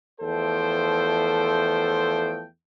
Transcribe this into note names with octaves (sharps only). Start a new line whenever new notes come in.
E2 F3 A3 A4 C5 G5